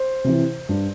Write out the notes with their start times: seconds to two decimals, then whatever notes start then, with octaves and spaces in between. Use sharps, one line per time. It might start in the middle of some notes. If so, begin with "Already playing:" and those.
Already playing: C5
0.24 C3 E3
0.69 G2